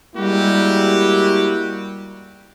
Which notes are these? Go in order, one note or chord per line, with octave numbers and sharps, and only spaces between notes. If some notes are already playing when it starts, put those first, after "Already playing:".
G3 G#3 A#3 E4 F#4 G4